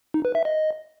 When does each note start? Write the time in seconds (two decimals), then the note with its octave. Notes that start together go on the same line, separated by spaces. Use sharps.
0.14 D#4
0.25 B4
0.35 E5
0.45 D#5